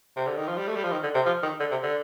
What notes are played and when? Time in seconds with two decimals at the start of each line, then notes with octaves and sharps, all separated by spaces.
0.17 C3
0.27 D3
0.37 D#3
0.48 F3
0.58 G3
0.68 A3
0.76 G3
0.84 F3
0.92 D#3
1.03 D3
1.15 C3
1.26 F3
1.43 D#3
1.60 D3
1.71 C3
1.83 D3